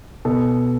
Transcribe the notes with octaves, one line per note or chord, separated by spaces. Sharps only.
B2 A4